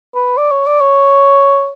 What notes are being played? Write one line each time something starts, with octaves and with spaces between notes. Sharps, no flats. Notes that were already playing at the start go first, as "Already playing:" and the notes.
B4
D5
C#5
D5
C#5